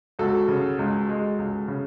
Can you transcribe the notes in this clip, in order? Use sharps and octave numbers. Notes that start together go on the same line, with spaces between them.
C#2 F#4 A4
C#3
C#2
G#3
C#2
C#3